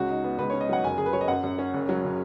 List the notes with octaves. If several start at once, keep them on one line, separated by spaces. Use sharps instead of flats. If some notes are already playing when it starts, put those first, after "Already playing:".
Already playing: C#2 C#4 F#4
D#4
B3
C#2 B4
C#4 C#5
D#5
F#3 F#5
F#1 G#5
F#1 G#4
B4
F#3 C#5
D#5
F#2 F#5
F#2
C#4
F#1
F#3
C#3